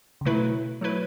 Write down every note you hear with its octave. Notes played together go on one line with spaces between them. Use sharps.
C#3
B2 F#3 A3 E4 B4
F#3 A3 E4 B4